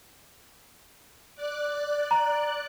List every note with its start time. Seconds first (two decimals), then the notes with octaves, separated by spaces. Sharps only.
1.35 D5 F#6
2.11 A#5